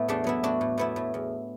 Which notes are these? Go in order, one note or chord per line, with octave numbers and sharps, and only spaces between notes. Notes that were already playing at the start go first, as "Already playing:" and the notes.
Already playing: A2 B3 E4
E2 A3 D4
F#3 B3 E4
A2 D4 F#4
A2
A2 B3 E4
A2
E2